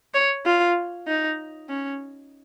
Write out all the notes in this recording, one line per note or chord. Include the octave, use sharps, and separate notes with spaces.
C#5
F4
D#4
C#4